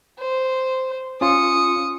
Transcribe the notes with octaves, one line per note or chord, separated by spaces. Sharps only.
C5
C#4 F4 D#6 C#7